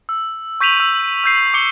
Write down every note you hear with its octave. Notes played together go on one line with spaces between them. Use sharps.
E6
C#6 G6 B6 D#7 F7 F#7
E6
E6 G6 C7
D6 C#7 G7